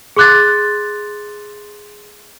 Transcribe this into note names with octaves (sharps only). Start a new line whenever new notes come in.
G#4 C6 D6 F#6 G#6 A6